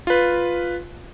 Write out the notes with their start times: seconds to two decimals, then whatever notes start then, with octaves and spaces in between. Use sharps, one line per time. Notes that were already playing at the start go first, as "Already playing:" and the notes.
0.07 F4 B4